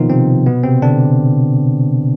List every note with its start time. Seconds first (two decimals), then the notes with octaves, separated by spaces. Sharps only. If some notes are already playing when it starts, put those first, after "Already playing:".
Already playing: B2 D#3 F3 A#3 B3 D#4 F4
0.10 C3 C4
0.46 B2 B3
0.64 C3 C4
0.82 D3 D4